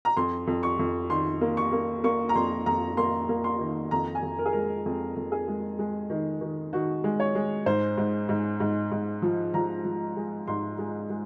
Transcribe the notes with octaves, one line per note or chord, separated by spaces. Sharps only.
A#5
F2 C6
F2
C#6
F2
D#3 C6
A#3
C#6
A#3
A#3 C#6
A#5
F2 C6
F2 A#5
A#3 C6
A#3
C6
D#3
F2 A#5
G#5
F2
A#4
G#4
G#3 A#4
F2
F2
G#4
G#3
G#3
D#3
D#3
D#3 F#4
G#3
C#5
G#3
G#2 C5
G#2
G#2
G#2
G#2
F3
F3 A#5
F3
G#3
G#2 C6
G#3
G#3